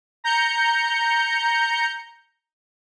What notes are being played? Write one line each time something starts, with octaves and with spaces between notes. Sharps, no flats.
A#5 G6 C#7